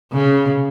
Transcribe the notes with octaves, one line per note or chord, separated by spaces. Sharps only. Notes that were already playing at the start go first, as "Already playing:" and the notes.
C#3